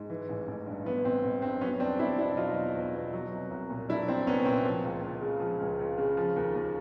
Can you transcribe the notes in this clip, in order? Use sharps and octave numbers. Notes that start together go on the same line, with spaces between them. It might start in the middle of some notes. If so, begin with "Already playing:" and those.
Already playing: G#2
E3
A1
A1
G2
E3 B3
A1 C4
A1
G2 C4
F#3 B3 C#4
E2 C4 D4
E2 D4 E4
B2 D4 E4
F#3 D#4 F4
E2
E2
B2
F#3
C2
C2
A#2
F#3 D4 E4
C2 C4 D4
C2 B3 C#4
A#2 C4
F3
C#2
C#2
C#3
F3
C#2
C#2
C#3
F3
D#2
D#2